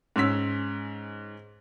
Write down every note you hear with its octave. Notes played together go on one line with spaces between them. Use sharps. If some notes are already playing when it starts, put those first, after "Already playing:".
G#2 C#4 E6 B6